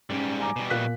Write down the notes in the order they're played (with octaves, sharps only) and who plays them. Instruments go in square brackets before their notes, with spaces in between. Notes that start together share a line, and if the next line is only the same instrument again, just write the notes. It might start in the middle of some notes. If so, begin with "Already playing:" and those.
[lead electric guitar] G#2 G3 [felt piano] C#4
[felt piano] G#5 A#5 D6
[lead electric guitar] B2 G3
[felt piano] A#2 F#6 B6